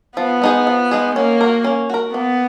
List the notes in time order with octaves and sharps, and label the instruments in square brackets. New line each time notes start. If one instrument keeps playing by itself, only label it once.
[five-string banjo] F3 [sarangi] B3
[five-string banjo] G#3 D#4 G#4
F3
G#3 D#4 G#4
[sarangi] A#3 [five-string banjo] C#4
[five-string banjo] F#4 A#4
C#4
F#4 A#4
[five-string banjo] A#3 [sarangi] B3